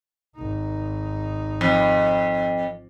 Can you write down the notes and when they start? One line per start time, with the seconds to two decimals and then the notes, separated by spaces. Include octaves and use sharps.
0.36 G#1 D#4
1.61 F2